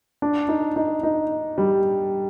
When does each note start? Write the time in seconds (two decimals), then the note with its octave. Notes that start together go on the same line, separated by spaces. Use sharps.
0.22 D4
0.49 D#4
0.76 D#4
1.03 D#4
1.58 G3